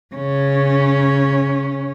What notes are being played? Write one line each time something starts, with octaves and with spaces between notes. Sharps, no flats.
C#3 C#4